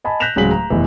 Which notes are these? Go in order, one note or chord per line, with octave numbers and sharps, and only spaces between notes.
D#5 G#5 A5 B5
F#6 G6 A#6 B6 E7 F7
D1 C#3 F#3 G#3 B6 F#7
A#5
F1 B2 E3